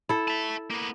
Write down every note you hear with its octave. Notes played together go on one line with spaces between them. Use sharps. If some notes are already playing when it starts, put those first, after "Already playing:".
E4 A4
E5 A5
A#3 B3